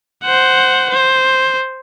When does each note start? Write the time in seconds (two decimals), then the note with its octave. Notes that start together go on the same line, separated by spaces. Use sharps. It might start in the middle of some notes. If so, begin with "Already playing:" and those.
0.24 C5 F#5
0.90 C5